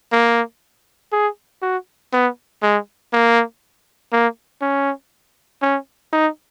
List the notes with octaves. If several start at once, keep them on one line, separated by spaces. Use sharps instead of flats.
A#3
G#4
F#4
B3
G#3
A#3
A#3
C#4
C#4
D#4